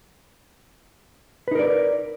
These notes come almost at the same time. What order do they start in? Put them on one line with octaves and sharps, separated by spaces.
B4 D#4 A#4 D5